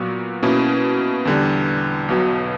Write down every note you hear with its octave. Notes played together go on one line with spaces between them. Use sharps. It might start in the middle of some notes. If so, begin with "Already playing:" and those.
Already playing: A#2 F#3 B3 F#4
B2 A#3 C#4 E4
E2 D3 G3
B1 B2 F#3